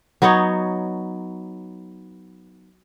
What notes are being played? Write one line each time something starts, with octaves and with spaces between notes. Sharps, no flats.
F#3 B3 D#4 C#5